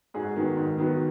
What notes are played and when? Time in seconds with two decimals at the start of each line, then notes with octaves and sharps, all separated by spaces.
0.14 G#2 F#4 G#4
0.36 D#3 F#3 B3
0.57 G#2
0.78 D#3 F#3 B3